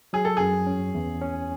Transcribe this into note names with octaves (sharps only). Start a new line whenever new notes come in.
F#3 G#4
A4
F#2 G#4
C#4
E2
C#4